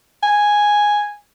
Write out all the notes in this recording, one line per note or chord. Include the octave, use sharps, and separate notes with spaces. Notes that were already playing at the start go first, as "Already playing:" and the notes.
G#5